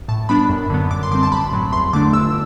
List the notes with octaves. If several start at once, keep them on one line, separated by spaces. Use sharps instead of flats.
A2 A5
G3 B3 D4 B5
F#2
D3 F#3 B3
F#2 D6
C6
D3 G3 C4 D6
A5
A1 B5
A2 F#3
E2 C6
D3 A3 D4 D6
G1 E6